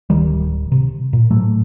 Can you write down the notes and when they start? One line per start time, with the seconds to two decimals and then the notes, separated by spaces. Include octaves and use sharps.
0.10 D1 D#3 G3
0.72 C3
1.13 A#2
1.31 A2 F#3 A3